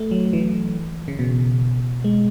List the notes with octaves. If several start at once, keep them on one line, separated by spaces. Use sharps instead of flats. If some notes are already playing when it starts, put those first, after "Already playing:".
Already playing: A3
F#3
E3
C#3
B2
G#3